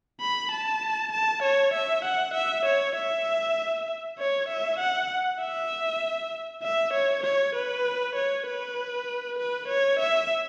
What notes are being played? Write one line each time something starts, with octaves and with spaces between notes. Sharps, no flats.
B5
A5
A5
C#5
E5
F#5
E5
C#5
E5
C#5
E5
F#5
E5
E5
C#5
C#5
B4
C#5
B4
B4
C#5
E5